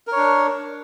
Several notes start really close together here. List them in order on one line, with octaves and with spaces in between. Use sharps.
A#4 C#5 D4